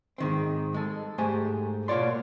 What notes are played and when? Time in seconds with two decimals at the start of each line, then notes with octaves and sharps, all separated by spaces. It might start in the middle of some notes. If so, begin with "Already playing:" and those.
0.18 G#2 D#3 C4
0.74 G#3 A4
1.18 G#2 A3 G4 C5 G#5
1.88 B2 A#3 F4 C#5 D5 C6